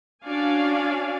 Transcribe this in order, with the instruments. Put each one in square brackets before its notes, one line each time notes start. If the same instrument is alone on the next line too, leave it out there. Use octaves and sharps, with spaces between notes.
[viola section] C#4 D4 F#4 D5 F5 G#5